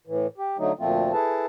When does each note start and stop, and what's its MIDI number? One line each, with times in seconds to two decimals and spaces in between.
0.07 0.27 45
0.07 0.27 52
0.38 0.57 67
0.58 0.72 50
0.58 0.72 54
0.58 0.72 57
0.58 0.72 63
0.79 1.12 38
0.79 1.12 46
0.79 1.12 53
0.79 1.12 57
0.79 1.12 60
0.79 1.12 65
1.13 1.46 64
1.13 1.46 68
1.13 1.46 69
1.13 1.46 71
1.13 1.46 81